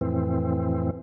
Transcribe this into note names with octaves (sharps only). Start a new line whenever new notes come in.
F2 A2 E3 C4